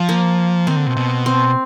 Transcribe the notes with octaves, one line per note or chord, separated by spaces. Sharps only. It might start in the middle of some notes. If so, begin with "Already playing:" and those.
Already playing: F3
A#3
D#3 C4
D3
B2
B2
C4